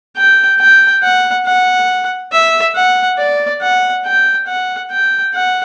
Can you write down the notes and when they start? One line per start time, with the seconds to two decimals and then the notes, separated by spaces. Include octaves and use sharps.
0.17 G5
0.60 G5
1.02 F#5
1.46 F#5
2.32 E5
2.75 F#5
3.18 D5
3.61 F#5
4.05 G5
4.47 F#5
4.91 G5
5.34 F#5